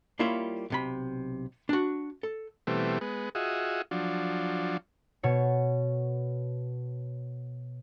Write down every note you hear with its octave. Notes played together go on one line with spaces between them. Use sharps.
G3 A#3 E4 F4 C#5 E5
B1 C3 B5
D4 F#4
A4
B2 E3 G3 A3 C4
G#3 B3
F4 F#4 G#4 D#5 E5
F3 F#3 D4
B2 C#5 C#7